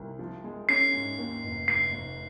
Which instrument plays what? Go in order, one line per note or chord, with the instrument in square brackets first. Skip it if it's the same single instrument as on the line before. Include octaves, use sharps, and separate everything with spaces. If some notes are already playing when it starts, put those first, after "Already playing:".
Already playing: [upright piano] C2
F3
G#3
[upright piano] C#4 [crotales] C7
[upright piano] G#2
D#2
F1
[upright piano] F1 [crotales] C7
[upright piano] F1